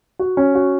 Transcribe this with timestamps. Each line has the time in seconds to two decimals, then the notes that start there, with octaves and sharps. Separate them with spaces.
0.19 F#4
0.37 C#4
0.55 F#4